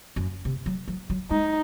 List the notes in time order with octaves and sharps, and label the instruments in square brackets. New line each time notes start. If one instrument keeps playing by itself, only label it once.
[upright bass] F#2
C3
F#3
F#3
F#3
[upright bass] G#3 [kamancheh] D#4